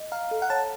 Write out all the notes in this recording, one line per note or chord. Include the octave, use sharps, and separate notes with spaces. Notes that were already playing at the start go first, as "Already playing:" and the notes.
Already playing: D#5
F5 A#5
A4
F#5
C#5 A5